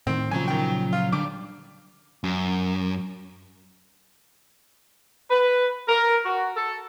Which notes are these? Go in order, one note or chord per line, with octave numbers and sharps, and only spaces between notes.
A2 D#3 C4
A#2 C#3 F3 F#3 G#5 A#5
D#3 G5
F4
D3 G3 D6
F#2
B4
A#4
F#4
A4